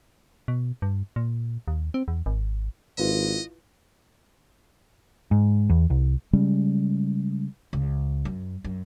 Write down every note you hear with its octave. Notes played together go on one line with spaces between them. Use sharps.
B2
G2
A#2
D#2
C4
E2
G#1
G#1 E4 F4 B4 D#5
G#2
E2
C2
C#3 G3 G#3 C#4
C#2
F#2
F#2